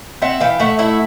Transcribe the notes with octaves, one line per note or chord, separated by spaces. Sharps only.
C4 E5 F#5
E3 F5 G5
A3 E5 F#5
E4 E5 F#5